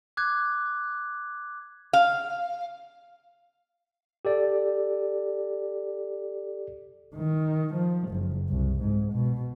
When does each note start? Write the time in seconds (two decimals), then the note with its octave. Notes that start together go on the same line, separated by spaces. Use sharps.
0.17 D6 F#6 G#6
1.93 F5
4.25 G4 A4 D5
7.15 D#3
7.74 F3
8.10 F#1
8.49 C2
8.81 G#2
9.13 B2